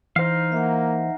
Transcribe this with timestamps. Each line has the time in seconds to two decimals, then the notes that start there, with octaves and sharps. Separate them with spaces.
0.16 E3 D#4 C5 F5
0.52 A#3 E5 F#5